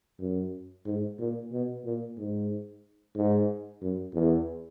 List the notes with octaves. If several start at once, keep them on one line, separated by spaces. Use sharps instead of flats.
F#2
G#2
A#2
B2
A#2
G#2
G#2
F#2
E2